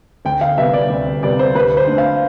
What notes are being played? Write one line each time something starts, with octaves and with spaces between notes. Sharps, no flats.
D2 G5
F5
C3 G3 B3 E5
D5
D2
C3 G3 B3 D5
C5
D2 B4
C5
D3 A3
F5